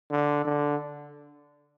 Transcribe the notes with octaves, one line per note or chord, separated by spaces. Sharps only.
D3
D3